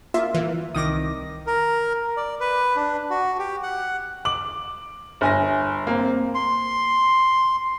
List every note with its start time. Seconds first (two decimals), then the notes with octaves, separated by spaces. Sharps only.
0.14 A#3 F4 E5
0.34 E3
0.75 C2 D#3 D6 D#6 A#6
1.47 A#4
2.17 D5
2.40 B4
2.76 D4
3.10 F#4
3.39 G4
3.63 F#5
4.25 D6 F#7
5.21 G1 G#5 A#6
5.87 A#3 C4
6.35 C6